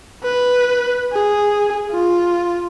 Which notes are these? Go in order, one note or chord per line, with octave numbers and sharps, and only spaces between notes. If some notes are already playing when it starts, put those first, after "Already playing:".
B4
G#4
F4